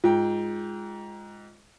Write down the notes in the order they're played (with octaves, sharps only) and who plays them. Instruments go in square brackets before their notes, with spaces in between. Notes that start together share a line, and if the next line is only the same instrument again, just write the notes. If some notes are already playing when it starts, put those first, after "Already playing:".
[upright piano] G#2 G5 [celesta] F4